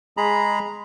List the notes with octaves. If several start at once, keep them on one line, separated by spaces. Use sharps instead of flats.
G#3 G#4 A#5 B5